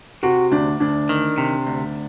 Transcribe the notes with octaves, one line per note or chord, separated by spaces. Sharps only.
C3 F#4
D2 D4
D2 D4
D#3
C3
D2